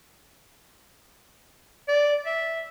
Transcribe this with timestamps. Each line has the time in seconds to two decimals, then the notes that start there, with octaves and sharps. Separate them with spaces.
1.88 D5
2.26 E5